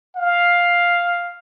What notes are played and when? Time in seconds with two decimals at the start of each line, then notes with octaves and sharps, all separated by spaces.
0.16 F5